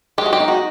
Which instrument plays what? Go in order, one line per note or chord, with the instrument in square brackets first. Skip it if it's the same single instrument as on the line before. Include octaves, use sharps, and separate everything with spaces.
[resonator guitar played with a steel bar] G#3 [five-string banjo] G4
[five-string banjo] F#4
G4
[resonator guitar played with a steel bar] D#4
[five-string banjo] F#4